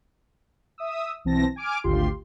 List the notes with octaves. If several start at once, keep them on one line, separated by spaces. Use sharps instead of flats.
E5 D#6 E6
B1 E3 C4 A5 A#6
G#5 D6 F6 D7
G#1 D2 F4 G4 C6